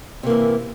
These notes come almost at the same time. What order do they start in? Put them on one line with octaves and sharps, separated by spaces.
C3 A#3 E3